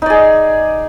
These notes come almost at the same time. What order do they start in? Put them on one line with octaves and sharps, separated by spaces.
D#4 D5 G#4